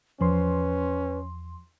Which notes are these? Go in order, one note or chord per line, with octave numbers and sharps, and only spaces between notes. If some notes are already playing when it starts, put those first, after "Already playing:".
E2 F3 C#4 B4 C6